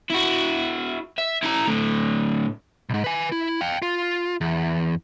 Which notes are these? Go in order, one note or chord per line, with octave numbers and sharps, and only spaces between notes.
E4 F#4
E5
E4 A#5
A2 D3
B1 G#2
B4 G#5
E4
F5 G5
F4
E2